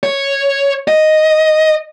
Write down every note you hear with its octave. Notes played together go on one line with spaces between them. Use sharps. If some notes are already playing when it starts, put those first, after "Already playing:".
C#5
D#5